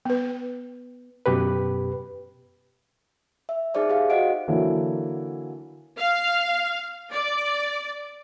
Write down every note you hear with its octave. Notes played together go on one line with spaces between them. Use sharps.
B3 B4
F#2 B2 G4 B4
E5
D#4 G#4 C5 D5 E5
G4 F5
F#4 C5 D#5 F#5 D7
D3 E3 F#3 A#3 E4
F5
D5